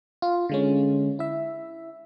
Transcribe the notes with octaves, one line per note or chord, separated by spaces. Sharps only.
F4
D3 G#3 C#4
E4 E5